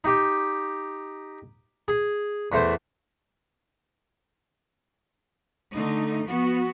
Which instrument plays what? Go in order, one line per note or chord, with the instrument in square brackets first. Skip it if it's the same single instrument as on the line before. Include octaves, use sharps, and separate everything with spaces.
[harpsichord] D#4 G4
G#4
E2 A3 C5
[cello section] D3 A3 D#4
F3 B3 F#4